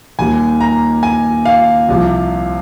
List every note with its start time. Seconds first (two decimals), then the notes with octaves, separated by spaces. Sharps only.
0.19 D#2 D#3 G3 G#5
0.60 A#5
1.03 G#5
1.45 F5
1.88 C2 C3 F3